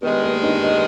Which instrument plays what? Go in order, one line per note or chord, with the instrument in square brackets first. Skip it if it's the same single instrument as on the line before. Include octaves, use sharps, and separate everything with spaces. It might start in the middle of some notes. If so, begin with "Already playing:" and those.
[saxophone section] G2 D#3 G#3 [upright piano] B3 B4
[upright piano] A#3 A#4
D#4 D#5
D#4 D#5